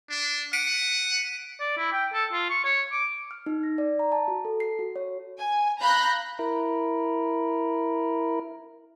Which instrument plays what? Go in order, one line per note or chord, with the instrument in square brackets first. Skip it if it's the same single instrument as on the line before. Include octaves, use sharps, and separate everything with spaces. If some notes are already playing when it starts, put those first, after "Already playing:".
[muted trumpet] D4
[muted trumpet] F#5 [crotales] B6 D7 D#7
[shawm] D5
E4
G5
A4
F4
C#6
C#5
D6
[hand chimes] F6
D#4
A#6
D5
A#5
A5
F#4
A4
C7
F#4
C#5
[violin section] G#5
F5 A#5 B5 F#6 G6 A#6
[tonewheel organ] E4 A#4